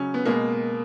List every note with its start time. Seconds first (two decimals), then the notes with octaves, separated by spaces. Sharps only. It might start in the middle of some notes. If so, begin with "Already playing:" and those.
Already playing: C#3 F#3 C#4
0.14 B3
0.26 B2 G#3 A#3